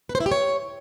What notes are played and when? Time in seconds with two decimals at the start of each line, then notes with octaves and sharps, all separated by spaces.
0.09 B4
0.15 C5
0.20 E4
0.26 G4
0.31 C#5